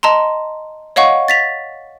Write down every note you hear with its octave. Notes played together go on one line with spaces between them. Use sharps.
D#5 A5 A#5 C6
C#5 D#5 F5 F#5 C#6
A6 B6 F7